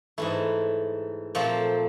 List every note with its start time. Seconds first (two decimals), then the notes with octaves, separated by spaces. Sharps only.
0.18 G#2 E3 A3 E4
1.35 A#2 F3 A3 C4